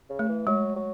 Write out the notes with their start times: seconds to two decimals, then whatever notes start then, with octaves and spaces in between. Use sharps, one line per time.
0.10 C#3
0.19 A3
0.29 E3
0.47 F#3 G#3
0.76 F#3